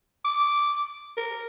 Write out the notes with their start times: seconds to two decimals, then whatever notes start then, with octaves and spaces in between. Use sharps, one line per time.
0.25 D6
1.17 A#4